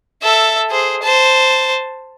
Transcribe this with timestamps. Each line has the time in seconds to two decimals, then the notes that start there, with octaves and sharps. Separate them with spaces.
0.22 A4 E5
0.70 G#4 C5
1.02 C5 A5